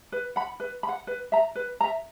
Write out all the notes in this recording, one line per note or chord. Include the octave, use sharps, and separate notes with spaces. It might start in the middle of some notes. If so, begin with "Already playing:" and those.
B4
F#5 B5
B4
B5
F#5
B4
E5 A#5
B4
E5 A#5